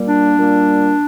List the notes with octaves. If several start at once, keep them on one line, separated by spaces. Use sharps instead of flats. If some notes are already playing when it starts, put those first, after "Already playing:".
Already playing: A#2 G3 A#3
D4
A#2 G3 A#3